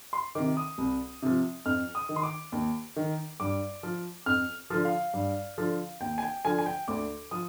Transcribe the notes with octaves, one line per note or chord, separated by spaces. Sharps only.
C6
C3 D#3 D6
D#6
C2
C3 F3
F2 F6
D#6
D#3
C6
D6
D#2
D#3
G2 D6
F3
F2 F6
D3 F3
F5
G2
D3 F3
D#2 G5
G#5
G5
D3 F3 G#5
G#5
G5
D2 D6
F3 D#6